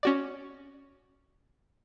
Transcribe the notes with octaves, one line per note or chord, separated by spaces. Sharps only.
C#4 F#4 D5